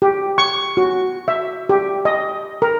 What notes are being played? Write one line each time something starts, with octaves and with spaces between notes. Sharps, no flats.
G4
C#6
F#4
E5
G4
D#5
A#4